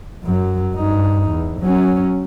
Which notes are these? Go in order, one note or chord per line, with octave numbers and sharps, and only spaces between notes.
F#2 F#3
G2 D#4
E2
F#3 C#4